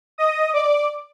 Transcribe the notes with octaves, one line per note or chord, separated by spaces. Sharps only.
D#5 D#6
D5 D6